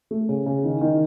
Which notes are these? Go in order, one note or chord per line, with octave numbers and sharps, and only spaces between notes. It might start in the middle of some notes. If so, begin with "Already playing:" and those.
A3
C#3
C#3
D#3
D#3